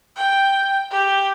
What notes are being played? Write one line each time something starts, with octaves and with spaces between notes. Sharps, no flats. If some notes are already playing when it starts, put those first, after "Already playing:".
G5
G4